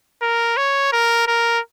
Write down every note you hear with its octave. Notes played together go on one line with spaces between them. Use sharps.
A#4
C#5
A#4
A#4